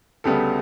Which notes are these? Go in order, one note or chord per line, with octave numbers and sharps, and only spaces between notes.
D2 C#3 G3 B3 A4